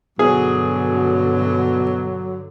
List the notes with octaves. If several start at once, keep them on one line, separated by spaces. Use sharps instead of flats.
G2 B2 D3 F#3 G#4